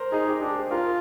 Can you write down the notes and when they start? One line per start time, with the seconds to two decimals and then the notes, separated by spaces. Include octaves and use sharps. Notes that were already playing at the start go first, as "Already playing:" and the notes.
Already playing: A#4 C5
0.12 D#4 G#4
0.27 G4
0.41 D4 G#4
0.56 C5
0.71 F4 A#4